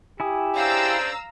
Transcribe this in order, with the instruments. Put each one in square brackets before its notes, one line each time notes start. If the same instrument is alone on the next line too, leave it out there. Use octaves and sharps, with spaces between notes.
[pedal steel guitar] E4 G#5 D#6 [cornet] G4
[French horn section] C#3 D4 C5 [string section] F5 A#5 E6